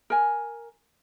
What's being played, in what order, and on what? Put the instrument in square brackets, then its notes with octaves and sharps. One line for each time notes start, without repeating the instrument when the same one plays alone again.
[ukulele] A#4 G#5